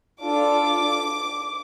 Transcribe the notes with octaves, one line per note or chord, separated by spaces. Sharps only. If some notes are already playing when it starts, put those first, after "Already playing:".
D4 F4 A4 D6